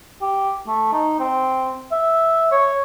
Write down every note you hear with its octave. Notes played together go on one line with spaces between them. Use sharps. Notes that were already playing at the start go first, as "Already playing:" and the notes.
G4
A3
D#4
C4
E5
C#5